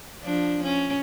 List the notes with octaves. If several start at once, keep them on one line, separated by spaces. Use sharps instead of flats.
F3 D4
C#4